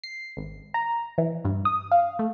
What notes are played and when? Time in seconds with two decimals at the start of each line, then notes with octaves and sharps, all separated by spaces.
0.04 C7
0.37 G#1
0.74 A#5
1.18 E3
1.45 G2
1.65 D#6
1.91 F5
2.19 A3